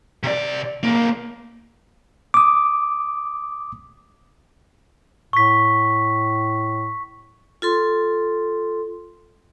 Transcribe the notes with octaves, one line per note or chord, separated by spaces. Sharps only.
C3 D5
B1 A#3
D6 D#6
A2 C#6 B6
F4 A4 C6